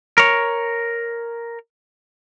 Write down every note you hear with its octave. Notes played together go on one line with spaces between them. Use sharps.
A#4 C#5